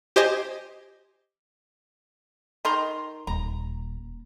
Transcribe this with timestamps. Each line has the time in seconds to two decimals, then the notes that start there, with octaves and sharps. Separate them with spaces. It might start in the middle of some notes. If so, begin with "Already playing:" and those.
0.16 G4 C5 D#5 G#5
2.65 D#3 A#5 C6
3.27 D#1 A#5